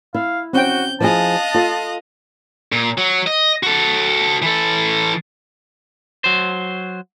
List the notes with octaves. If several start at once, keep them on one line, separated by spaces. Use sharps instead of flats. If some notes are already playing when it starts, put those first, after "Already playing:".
E4 F5
C4 C#4 F#4 G5 G6
F3 E4 G#4 D#5 F5 A5 F#6
F4 A4
A#2
F#3
D#5
F#4 A4
E3 A4
F#3 C5